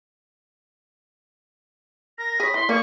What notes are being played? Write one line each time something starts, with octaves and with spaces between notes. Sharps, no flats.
A#4 A#6
G#4 C#5 B5
E3 C6
A#3 G#4 D5 C#6